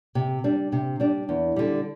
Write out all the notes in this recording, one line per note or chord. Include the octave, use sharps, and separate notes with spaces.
C3
G3 D4
C3
G3 D4
E2
D3 G3